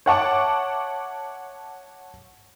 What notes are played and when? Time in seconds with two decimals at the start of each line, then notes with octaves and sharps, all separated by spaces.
0.06 C#5 E5 F#5 A5 C#6 D6